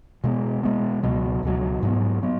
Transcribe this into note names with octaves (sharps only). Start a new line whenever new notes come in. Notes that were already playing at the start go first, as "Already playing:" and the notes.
B2 G#3 B3
B2 G#3 B3
C#2 B2 F#3
C#2 B2 F#3
G#2 F#3 B3
F#3 B3